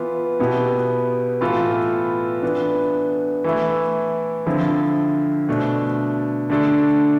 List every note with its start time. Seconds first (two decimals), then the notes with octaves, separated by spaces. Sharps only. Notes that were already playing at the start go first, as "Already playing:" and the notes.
Already playing: E3 B3 F4
0.39 B2 B3 E4 G4
1.41 A2 E3 B3 F4 A4
2.43 E3 B3 D4
3.44 E3 A3 E4
4.46 D3 F3 C4 E4
5.49 B2 A3 D4
6.50 D3 A3 D4 A4